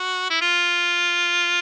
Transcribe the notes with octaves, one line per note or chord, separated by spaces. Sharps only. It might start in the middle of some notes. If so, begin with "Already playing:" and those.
Already playing: F#4
E4
F4